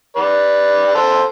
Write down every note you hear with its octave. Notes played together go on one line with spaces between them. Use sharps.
B4 D5
A4 C5